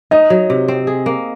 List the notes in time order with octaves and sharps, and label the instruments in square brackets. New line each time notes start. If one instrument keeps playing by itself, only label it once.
[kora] D#4 [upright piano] D#5
[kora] F#3
C3
C4
G#4
A#3